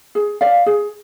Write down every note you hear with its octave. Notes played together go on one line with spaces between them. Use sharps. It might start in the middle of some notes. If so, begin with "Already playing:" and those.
G#4
D5 F5
G#4